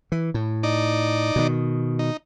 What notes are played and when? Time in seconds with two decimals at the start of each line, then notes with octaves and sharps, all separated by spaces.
0.12 E3
0.34 A2
0.63 D#4 D5
1.36 B2 D#3
1.99 D#4